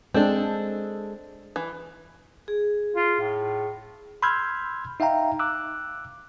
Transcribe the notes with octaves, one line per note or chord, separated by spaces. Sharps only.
G#3 C4 D4 A4
E3
G#4
F4
A2
B5 C6 E6 F6 G6 G#6
D#4 E5 F5 G5 A#5
D6 E6 F#6